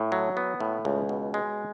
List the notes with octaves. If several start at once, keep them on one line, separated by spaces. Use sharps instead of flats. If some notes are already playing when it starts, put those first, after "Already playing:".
Already playing: A2
F#3
B3
A2
C#2
B2
G#3